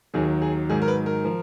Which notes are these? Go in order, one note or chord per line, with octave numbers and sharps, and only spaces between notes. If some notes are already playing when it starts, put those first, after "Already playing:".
D#2 D#3 F#3 G#4
G#4
G#2 D#3 F#3 G#4
A#4
B4
A#4
F3